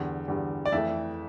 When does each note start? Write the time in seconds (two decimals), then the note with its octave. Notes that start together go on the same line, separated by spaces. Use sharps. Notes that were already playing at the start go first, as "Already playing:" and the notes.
Already playing: E2 D3 G3
0.28 E2 D3 G3
0.66 D5
0.72 F2 E3 A3 E5